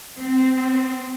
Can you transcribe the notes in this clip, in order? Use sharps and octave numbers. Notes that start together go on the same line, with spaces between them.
C4